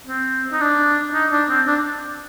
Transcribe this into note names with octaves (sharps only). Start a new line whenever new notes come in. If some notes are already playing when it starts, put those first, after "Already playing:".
C4
D#4
D4
D#4
D4
C4
D4